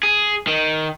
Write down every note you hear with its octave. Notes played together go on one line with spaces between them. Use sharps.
G#4
D#3